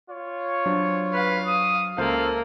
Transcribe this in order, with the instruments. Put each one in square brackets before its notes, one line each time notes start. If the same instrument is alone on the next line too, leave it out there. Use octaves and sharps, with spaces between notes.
[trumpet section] F4 C#5
[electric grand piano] F#3 D4 C5
[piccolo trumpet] B4 [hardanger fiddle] F5
[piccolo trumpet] D#6
[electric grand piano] C#2 C5 G6 [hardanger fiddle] A#3 [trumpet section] F4 E5 F5 [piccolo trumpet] A4